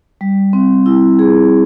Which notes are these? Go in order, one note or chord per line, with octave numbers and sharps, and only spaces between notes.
G3
C4
E4
G#4